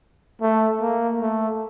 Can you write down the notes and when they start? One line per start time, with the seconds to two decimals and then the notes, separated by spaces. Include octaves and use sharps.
0.41 A3
0.81 A#3
1.21 A3